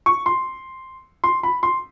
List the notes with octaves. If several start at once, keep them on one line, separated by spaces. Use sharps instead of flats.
C#6
C6
C6
B5
C6